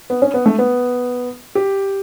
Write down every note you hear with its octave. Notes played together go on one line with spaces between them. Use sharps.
B3
C#4
B3
A3
B3
G4